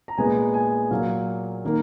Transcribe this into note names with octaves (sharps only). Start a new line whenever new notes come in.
A#5
A#2 G#3 B3 G#5
G#5
A#2 F#3 A#3 F5
D#3 A#3